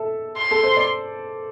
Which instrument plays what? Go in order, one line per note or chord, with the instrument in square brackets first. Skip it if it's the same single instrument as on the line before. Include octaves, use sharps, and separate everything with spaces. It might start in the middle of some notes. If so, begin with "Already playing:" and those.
Already playing: [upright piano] A4 E5
[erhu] C6
[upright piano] A4
C5
D5